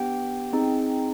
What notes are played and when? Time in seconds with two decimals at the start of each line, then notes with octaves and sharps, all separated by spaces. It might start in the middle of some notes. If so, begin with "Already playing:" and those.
Already playing: B3 D4 G4 G5
0.53 C4 D#4 G#4